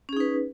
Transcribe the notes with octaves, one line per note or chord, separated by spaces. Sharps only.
C#4 D#4 G#4 B4